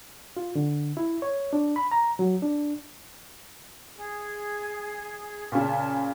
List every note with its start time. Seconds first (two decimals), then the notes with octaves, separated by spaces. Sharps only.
0.37 F4
0.55 D3
0.97 E4
1.22 C#5
1.53 D4
1.76 B5
1.92 A#5
2.19 F#3
2.42 D4
3.96 G#4
5.52 A#2 C#3 A5